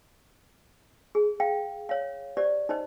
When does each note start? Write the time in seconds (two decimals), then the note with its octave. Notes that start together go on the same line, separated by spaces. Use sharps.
1.15 G#4
1.40 F5 G5
1.89 C#5 F5
2.37 G4 C5 D5
2.69 D#4 C5 D#5